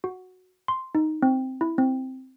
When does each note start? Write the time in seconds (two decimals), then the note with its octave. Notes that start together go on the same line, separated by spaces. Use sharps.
0.04 F#4
0.68 C6
0.95 D#4
1.22 C4
1.61 E4
1.78 C4